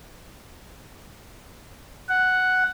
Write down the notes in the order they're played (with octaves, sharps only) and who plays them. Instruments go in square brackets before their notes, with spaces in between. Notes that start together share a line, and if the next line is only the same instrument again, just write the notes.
[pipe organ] F#5